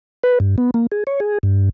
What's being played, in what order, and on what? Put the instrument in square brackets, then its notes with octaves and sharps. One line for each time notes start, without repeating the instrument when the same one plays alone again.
[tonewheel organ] B4
G2
B3
A#3
G#4
C#5
G#4
G2